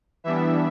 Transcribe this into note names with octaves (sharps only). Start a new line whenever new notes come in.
E3 G3 B3 D4 E5